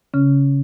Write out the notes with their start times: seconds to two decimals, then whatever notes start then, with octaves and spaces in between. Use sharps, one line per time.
0.14 C#3 C#4